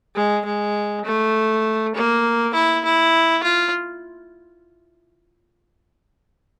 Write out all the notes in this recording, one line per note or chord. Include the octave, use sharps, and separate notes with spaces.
G#3
G#3
A3
A#3
E4
E4
F4